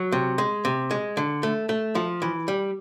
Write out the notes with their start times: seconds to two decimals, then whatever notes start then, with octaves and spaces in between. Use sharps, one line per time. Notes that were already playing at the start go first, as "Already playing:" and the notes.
Already playing: F#3
0.12 C3
0.38 G#3
0.65 C3
0.91 G#3
1.17 D3
1.43 A3
1.69 A3
1.95 F3
2.22 E3
2.48 G3